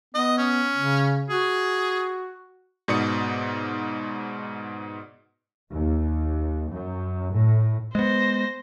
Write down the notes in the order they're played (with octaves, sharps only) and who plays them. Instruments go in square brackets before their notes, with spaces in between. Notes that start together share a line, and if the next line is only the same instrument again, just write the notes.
[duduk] B3 [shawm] D#5
[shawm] C#4
[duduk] C#3
[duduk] F#4 [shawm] G#4
[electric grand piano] G#2 B2 D5 D#6 C#7
[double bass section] D#2
F#2
A2
[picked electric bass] G#3 B3 [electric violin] C5 A#6